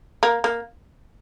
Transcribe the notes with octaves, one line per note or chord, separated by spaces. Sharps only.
A#3
A#3